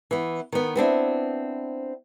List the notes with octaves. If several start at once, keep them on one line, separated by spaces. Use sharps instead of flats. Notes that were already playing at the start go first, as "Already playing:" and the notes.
E3 B3
D#3 B3
B3 C4 D4 E4